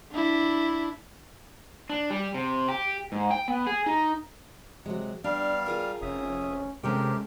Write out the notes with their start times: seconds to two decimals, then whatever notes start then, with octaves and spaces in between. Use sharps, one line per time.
0.12 D4 E4
1.90 D4
2.10 G3
2.34 C3
2.68 G4
3.12 G#2
3.31 G5
3.48 B3
3.67 G#4
3.86 D#4
4.86 C3 F#3 G#3
5.24 G3 B3 D4 F5
5.66 F4 G#4 A#4
6.02 F1 C#4 E5 D#6
6.83 C3 G#3 A3 C#4 G4 A#4 G5